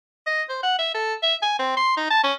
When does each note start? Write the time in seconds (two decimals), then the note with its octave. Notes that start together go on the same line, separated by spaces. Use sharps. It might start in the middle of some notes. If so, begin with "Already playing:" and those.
0.26 D#5
0.49 C5
0.63 F#5
0.79 E5
0.94 A4
1.23 E5
1.42 G#5
1.59 C4
1.77 C6
1.97 D#4
2.10 A5
2.23 C#4